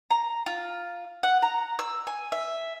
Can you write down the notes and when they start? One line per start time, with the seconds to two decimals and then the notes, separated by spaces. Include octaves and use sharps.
0.11 A#5
0.46 F4
1.23 F#5
1.42 A#5
1.79 E6
2.07 G#5
2.32 E5